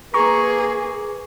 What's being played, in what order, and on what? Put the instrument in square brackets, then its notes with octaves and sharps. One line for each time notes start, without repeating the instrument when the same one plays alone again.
[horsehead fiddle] A#3 G#4 [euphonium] B4 [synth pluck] A#5 C#6